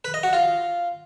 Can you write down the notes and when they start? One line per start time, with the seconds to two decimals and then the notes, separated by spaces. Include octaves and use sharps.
0.05 B4
0.14 D#5
0.23 F#4
0.33 F4